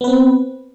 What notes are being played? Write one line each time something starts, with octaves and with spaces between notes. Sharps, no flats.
B3 C4 B4